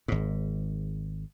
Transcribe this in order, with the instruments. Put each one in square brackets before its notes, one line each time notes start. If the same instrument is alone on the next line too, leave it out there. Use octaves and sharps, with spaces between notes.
[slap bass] G#1 G#2